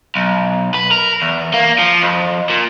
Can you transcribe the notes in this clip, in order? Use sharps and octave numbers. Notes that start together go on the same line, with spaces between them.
B1
B4
A#4
E2
A#3
F3
F2
A#2